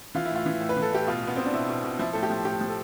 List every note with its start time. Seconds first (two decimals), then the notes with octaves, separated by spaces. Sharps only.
0.15 E3 F4
0.25 E4
0.30 A2
0.36 F4
0.46 E3
0.61 A2
0.69 B4
0.77 E3
0.82 A4
0.92 A2 G4
1.07 B2 F4
1.23 B2 B3
1.36 B2 C4
1.45 D4
1.53 B2 E4
1.69 B2
1.84 B2
1.99 F3 E4
2.13 A2 A4
2.23 G4
2.30 F3
2.45 A2 G4
2.61 F3
2.69 A4